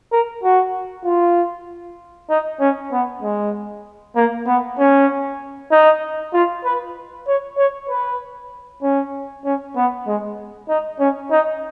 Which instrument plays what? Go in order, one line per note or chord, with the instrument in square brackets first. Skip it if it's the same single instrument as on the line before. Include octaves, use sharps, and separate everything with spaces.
[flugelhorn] A#4
F#4
F4
D#4
C#4
B3
G#3
A#3
B3
C#4
D#4
F4
B4
C#5
C#5
B4
C#4
C#4
B3
G#3
D#4
C#4
D#4